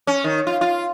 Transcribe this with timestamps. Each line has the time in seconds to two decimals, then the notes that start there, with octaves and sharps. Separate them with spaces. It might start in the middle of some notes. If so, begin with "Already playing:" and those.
0.07 C#4
0.24 D#3
0.47 F4
0.61 F4